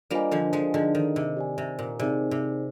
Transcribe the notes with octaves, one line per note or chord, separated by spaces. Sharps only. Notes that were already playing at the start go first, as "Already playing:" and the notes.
G3 A#3 D4 F4 C5 D#5 G#5
D3 F3
F3 G#3
D3 F3 D#4 G#4 D#5 G5
D#3
C3
G4 D5 G#5
C3
A#2
C3 C4 D#4 G#4 D5 G#5
C3